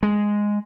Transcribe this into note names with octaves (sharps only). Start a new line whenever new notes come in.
G#3